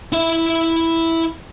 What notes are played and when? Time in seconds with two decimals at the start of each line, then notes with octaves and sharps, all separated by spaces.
0.12 E4 E5